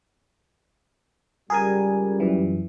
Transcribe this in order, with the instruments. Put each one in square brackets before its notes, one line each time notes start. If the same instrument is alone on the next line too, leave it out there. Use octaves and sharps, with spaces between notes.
[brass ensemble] C#2 G3 [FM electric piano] G#4 A#4 G#5
[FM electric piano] F#2 E3